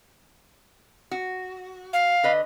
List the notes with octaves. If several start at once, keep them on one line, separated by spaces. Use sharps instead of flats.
F#4
F5
D3 B4 D#5